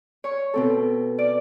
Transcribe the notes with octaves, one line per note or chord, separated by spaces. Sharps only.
C#5 C#6
B2 C4 A4
D5